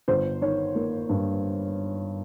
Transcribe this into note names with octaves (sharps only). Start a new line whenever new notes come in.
G1 C5
D#3 C#5
A#3
G2